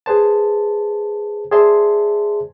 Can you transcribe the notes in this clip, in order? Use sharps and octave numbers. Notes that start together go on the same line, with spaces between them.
G#4 B4 C5 A5
G#4 C5 D5 E5 A5 C6